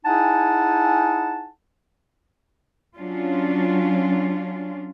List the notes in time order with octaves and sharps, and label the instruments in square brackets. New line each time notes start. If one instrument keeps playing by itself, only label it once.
[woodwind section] D#4 E4 G#4 F#5 G#5 A5
[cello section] F#3 C#4 D4 F4